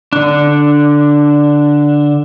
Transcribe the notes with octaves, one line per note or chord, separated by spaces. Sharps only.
D3 D4